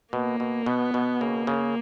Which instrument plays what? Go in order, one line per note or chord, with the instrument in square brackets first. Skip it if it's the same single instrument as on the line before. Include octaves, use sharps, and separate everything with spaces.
[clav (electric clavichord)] B2 [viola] A#3
[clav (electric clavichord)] B2
[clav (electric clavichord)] B2 [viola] B3
[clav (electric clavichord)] B2
[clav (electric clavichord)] C#3 [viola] A#3
[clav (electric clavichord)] C#3